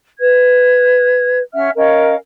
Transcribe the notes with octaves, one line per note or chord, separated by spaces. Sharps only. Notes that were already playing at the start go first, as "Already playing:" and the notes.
B4 G#6
C#4 E5 F#5 F6
C#4 A#4 D#5 F5